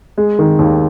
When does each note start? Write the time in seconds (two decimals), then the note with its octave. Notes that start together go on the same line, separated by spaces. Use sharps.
0.18 G#3
0.39 D#3
0.59 D#2